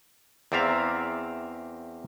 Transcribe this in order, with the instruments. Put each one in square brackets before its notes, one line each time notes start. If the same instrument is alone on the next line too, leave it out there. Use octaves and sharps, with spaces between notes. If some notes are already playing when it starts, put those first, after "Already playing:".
[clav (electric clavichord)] E2 C4 D5 E5 F5 A#5